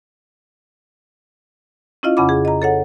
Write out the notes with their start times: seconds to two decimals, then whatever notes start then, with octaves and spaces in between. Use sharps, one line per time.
2.03 C#4 E4 F4 D#5 F5
2.17 F2 C#3 C#4 F#5 B5 D6
2.29 G#4
2.45 D#5 A#5
2.62 A4 C#5 F#5